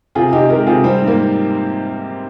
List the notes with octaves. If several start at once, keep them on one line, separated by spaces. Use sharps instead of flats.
C3 F4 G#4
C3 D#4 G4
G#3 G4 A#4
C3 F4 G#4
G3 C4
G#2
A#3